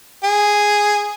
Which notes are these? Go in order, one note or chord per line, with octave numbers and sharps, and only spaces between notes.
G#4